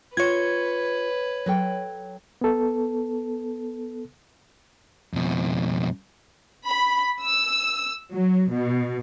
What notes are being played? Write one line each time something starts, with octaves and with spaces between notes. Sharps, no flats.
F4 B4 C#5 G#6
F#3 A4 G5
B3 A4
F2 B2
B5
E6
F#3
B2